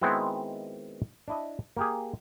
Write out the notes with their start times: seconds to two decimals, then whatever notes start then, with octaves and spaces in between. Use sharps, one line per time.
0.01 D#3 G#3 B3 C4 E4 F#4
1.28 D4 E4 D#5
1.77 A#3 G4 G#4